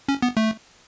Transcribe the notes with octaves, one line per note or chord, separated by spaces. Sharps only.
C#4
B3
A3